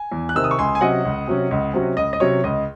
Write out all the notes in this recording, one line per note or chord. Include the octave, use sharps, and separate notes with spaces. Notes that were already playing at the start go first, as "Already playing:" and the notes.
Already playing: G#5
E2
F#6
C3 D#3 E6
D#6
C#6
C#2 G#5 C6
G#5
C3 F#3 C#4 D#5 F#5
C#2
C3 F#3 C#4
C#2
C3 F#3 C#4
C#2 D#5
D#5
C3 F#3 C#4 C#5
C#2 D#5